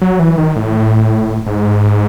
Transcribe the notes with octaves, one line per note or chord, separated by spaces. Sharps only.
F#3
E3
D#3
A2
G#2